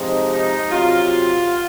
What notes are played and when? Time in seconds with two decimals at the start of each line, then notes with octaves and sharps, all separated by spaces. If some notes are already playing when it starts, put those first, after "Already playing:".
Already playing: C3 F3 G#3 D#4
0.30 D#4
0.70 C3 F#3 F4